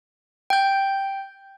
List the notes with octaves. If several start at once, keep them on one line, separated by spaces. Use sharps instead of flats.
G5 G6